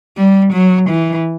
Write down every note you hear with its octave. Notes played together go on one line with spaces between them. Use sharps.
G3
F#3
E3